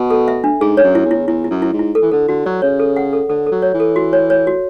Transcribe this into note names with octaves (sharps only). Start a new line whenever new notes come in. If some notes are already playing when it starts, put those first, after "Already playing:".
Already playing: B2
A4
E5
D4
G#2 G#4
C#5
F#2
E4
E2
E4
E2 E4
E4
F#2
E4
G#2
E4
A4
E3
D3 A4
D3 F#4
F#3 D5
C#3 C#5
A4
F#5
A4
D3 A4
A4
F#3
C#5
E3
A4
F#4
C#5
C#5
F#4